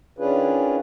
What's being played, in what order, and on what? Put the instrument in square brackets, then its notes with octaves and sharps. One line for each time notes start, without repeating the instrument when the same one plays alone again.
[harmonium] D#3 C#4 D4 F4 G#4 B4